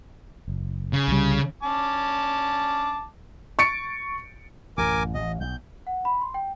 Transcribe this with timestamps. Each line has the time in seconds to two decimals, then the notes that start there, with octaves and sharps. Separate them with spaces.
0.48 F#1
0.93 C#3
1.08 C2 G3
1.63 C#4 A5 D6
3.59 C#6 A6 C#7 D7
4.78 A1 F#2 A#4 G#5 D6
5.15 A1 D#5
5.41 B1 G6
5.87 F#5
6.05 B5
6.21 C6
6.34 G5